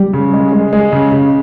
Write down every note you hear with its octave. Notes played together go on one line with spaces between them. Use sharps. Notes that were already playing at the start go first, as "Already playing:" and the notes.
Already playing: G3
C#3
G#3
G#3
G#3
C#3
C#3